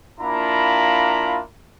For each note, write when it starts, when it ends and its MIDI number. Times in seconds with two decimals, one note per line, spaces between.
0.20 1.40 58
0.20 1.40 62
0.20 1.40 64
0.20 1.40 65
0.20 1.40 82
0.20 1.40 83